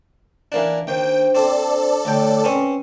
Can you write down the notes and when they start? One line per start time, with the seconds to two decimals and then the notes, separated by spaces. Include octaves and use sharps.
0.52 E3 A#3 D4
0.87 D#2 D4 C5 G5
1.35 C4 A4 D5
2.05 D2 C#5 G5
2.44 C4 C#4 B4